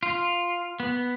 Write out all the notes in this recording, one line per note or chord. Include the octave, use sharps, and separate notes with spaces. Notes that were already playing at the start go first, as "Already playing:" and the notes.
F4
B3